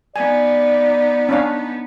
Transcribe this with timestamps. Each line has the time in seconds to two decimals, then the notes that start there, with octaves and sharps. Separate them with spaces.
0.16 B3 D#4 D5 G#5
1.29 C#4 D4 F5